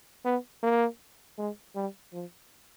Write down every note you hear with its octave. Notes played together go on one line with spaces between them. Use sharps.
B3
A#3
G#3
G3
F3